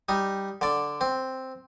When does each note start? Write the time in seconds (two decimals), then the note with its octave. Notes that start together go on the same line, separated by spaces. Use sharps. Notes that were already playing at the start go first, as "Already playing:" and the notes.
0.09 G3 D#4
0.61 D3 D5
1.01 C4